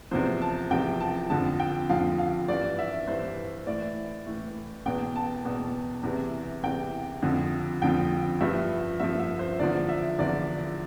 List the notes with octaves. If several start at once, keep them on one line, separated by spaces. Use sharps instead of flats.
E2 C3 F3 C5
A5
E2 C3 F3 G5
A5
F2 D3 F3 A5
G5
F2 D3 F3 F5
F5
G2 E3 D5
E5
G2 E3 C5
A2 E3 D5
A2 E3
E2 B2 G5
A5
E2 B2
E2 C3 E3
E2 C3 E3 G5
F2 D3 F3
F2 D3 F3 G5
G2 F3 E5
G2 F3 E5
E5
C5
E2 D3 F3 D5
E5
E2 D3 F3 D5